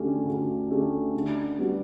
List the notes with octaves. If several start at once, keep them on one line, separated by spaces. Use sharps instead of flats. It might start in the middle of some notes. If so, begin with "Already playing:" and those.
Already playing: D2 D3 A3 C#4 G4
D2
D3 A3 C#4 G4
D3
G3 B3 F#4